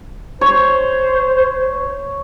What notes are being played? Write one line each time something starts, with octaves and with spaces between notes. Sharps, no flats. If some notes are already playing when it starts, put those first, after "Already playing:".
C5 C#5